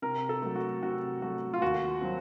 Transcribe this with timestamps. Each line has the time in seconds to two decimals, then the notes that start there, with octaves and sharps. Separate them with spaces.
0.02 C3 A#4
0.29 A4
0.42 F#3 A3
0.55 F#4
0.82 C3 F#4
1.22 F#3 A3 F#4
1.54 F4
1.62 D#2 F#4
2.01 F#3 C4